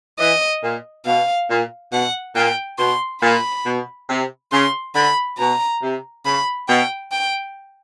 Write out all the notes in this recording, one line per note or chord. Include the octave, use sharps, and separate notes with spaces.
E3 D#5
A#2
B2 F5
A#2
B2 F#5
A#2 G5
B2 C6
A#2 B5
B2
C3
C#3 C6
D3 B5
B2 A#5
C3
C#3 B5
B2 G5
G5